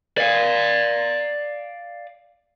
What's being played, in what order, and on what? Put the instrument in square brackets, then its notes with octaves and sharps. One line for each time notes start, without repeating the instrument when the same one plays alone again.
[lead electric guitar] D5 F5